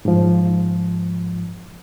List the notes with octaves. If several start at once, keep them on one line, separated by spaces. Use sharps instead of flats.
G#2 F3